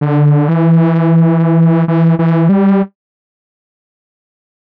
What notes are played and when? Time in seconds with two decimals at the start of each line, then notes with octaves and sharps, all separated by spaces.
0.01 D3
0.48 E3
1.88 E3
2.19 E3
2.49 G3